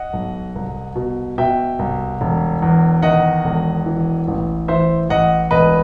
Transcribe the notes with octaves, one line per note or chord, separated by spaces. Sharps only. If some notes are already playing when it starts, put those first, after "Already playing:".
Already playing: D#5 F#5
B1
C2
B2
B2 E5 G5
C2
E1
E2
D#3 D#5 F#5
E1
E3
A1
E3 C5 E5
A1 D#5 F#5
E1 B4 D#5